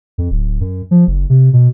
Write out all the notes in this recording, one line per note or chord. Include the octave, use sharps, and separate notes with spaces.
F2
D1
F#2
F3
F#1
C3
B2